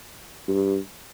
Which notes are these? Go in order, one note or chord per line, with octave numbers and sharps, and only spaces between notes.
G2